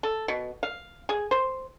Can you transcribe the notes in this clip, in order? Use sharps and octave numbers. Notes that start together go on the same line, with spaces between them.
A4
B2
F5
G#4
C5